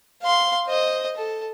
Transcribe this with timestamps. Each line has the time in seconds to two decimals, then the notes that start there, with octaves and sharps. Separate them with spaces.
0.22 F5 C6
0.67 C5 D#5
1.17 A4